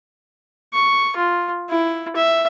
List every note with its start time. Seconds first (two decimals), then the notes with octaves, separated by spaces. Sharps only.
0.73 C#6
1.16 F4
1.69 E4
2.16 E5